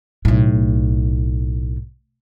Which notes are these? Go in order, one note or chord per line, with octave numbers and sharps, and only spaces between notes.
B1 A2